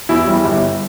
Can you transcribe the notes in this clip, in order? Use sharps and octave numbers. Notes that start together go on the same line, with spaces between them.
E2 E4
G3
G1